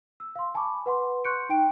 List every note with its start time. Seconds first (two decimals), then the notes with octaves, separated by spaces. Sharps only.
0.20 E6
0.36 F5 C6
0.54 G#5 A5 B5 C#6 D6
0.86 B4 F#5 C6
1.24 C6 C#6 F#6 G6 C#7 D7
1.49 D#4 G5 D7